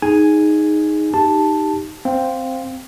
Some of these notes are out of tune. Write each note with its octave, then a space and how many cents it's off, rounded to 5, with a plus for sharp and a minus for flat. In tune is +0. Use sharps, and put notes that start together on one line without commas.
D#4 +0 G#4 +0 G#5 +0
D#4 +0 G4 +0 A5 +0
C4 +0 F5 +10